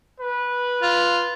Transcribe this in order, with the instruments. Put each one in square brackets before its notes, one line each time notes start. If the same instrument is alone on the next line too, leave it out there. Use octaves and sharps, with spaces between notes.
[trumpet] B4
[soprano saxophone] F4